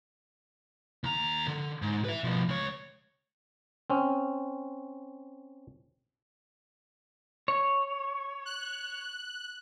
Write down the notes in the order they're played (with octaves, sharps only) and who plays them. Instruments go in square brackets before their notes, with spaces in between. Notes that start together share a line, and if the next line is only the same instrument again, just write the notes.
[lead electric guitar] D#2 A#5
D3
G#2
B4 E5
B2 F3
C#2 C#5
[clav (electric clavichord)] C4 C#4
[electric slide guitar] C#5
[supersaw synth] F#6